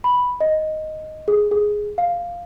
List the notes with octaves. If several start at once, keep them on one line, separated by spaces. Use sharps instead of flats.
B5
D#5
G#4
G#4
F5